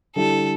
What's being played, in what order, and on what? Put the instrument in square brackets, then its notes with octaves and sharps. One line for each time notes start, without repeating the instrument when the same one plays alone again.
[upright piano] D3 G3 E4 G4 [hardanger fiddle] A4